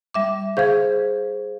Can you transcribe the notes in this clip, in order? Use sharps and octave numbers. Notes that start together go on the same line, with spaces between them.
G3 E5 D6
G#4 C5 F5 G6 G#6